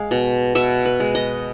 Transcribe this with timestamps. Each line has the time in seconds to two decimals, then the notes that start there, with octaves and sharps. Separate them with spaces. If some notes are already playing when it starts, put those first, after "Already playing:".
Already playing: G#3 F5
0.11 B2
0.55 B2 E5
0.85 B4
1.00 G#3
1.15 D#5